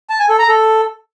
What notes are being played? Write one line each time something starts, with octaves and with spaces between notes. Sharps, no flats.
A5
G#5
A4
A#5
A4